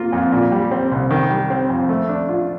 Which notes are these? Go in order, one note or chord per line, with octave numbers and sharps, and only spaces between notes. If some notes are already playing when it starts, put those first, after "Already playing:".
Already playing: A#3 F4
F2
A#2
G3
C4
C2
D#3
G3
C4
F2
A3
D4
F4